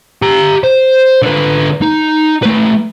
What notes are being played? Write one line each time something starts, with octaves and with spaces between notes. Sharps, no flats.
G4 A#5
C5
D3 B4
D#4
A3 B4